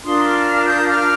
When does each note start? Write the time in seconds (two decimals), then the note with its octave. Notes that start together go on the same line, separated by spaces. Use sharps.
0.04 D4 F4 A#4 C6 D#6
0.25 D6 F6
0.46 D6 F6
0.67 D#6 G6
0.88 D6 F6